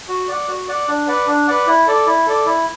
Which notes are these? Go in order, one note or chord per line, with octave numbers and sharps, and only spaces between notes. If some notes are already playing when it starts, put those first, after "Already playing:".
F#4
D5 F#5
F#4
D5 F#5
D4
B4 D5 F#5
D4
B4 D5 F#5
E4
A4 D5
E4
A4 D5
E4